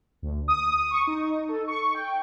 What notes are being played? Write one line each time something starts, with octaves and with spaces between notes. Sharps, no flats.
D2
D#6
C#6
D#4
A4
C#6
G5